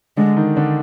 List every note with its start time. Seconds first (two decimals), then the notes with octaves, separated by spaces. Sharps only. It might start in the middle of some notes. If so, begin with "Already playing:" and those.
0.17 D3 G#3 D4
0.36 D#3 D#4
0.56 D3 D4